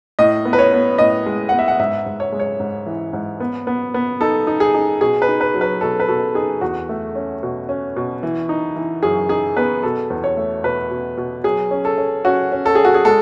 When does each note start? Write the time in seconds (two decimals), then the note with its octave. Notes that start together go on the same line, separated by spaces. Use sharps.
0.19 A2 D#5
0.45 B3
0.53 B4
0.59 C#5
0.73 B3
0.98 A2 D#5
1.26 G#3
1.49 B3 F#5
1.59 E5
1.68 F#5
1.79 G#2 E5
2.06 G#2
2.20 C#5
2.32 G#3
2.40 C#5
2.60 G#2
2.86 E3
3.13 G#2
3.40 B3
3.67 B3
3.94 B3
4.21 D#4 A4
4.47 D#4
4.60 G#4
4.74 D#4
5.01 B2 G#4
5.22 B4
5.28 D#4
5.41 B4
5.54 F#3
5.61 B4
5.81 B2 A4
6.00 B4
6.08 B2 A4
6.35 D#4 G#4
6.61 E2 F#4
6.89 A3
7.15 C#4
7.43 B2
7.69 C#4
7.96 B2
8.23 E3
8.49 D#4
8.76 E3
9.03 F#2 G#4
9.29 D#4 G#4
9.57 B3 B4
9.83 B2 A4
10.10 E2
10.24 C#5
10.37 A3
10.64 B2 B4
10.91 B2
11.17 B2
11.44 F#3 G#4
11.71 C#4
11.85 A4
11.98 C#4
12.25 C#4 F#4
12.52 C#4
12.66 A4
12.75 C#4 G#4
12.85 F#4
12.94 G#4
13.05 G#3 A4